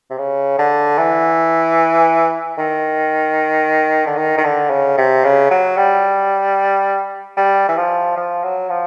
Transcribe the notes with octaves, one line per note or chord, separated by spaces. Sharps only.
C3
C#3
D3
E3
D#3
D3
D#3
D#3
D3
C#3
C3
C#3
F#3
G3
G3
E3
F3
F3
F#3
F3